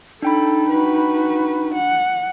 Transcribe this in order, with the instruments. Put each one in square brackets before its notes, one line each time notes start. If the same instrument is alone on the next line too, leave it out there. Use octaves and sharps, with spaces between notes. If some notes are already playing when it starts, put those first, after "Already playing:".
[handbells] D4 G5 B5 [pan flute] D#4 [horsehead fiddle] A4
[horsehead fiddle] F#4 B4
F#5